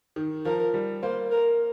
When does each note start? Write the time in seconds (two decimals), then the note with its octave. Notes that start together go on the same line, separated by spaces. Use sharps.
0.16 D#3
0.45 F3 A#4
0.74 G3
1.02 A#3 C5
1.31 A#4